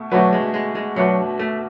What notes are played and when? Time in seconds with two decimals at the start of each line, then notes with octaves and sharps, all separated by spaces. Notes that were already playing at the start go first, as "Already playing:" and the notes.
Already playing: B2 A3
0.11 B2 F#3 A3 D4 F#4 B4
0.33 G#3
0.54 G#3
0.75 G#3
0.96 B2 F#3 A3 D4 F#4 B4
1.39 A3